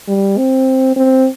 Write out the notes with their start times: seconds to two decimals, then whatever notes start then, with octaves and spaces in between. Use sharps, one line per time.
0.08 G3
0.38 C4
0.96 C4